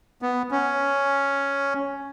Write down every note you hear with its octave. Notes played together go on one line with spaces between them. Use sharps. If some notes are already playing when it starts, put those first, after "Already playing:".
B3
C#4